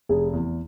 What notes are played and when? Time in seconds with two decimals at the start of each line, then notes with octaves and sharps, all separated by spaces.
0.09 F1 G#4
0.33 E2